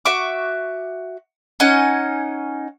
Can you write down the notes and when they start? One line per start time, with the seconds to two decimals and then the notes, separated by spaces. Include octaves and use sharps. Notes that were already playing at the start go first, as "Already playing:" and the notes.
0.05 F#4 E5 C#6 D6
1.60 C#4 D#4 F#5 G#5